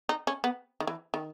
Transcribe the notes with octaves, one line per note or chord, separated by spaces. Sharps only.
D#4
C#4
B3
D#3
E3
D#3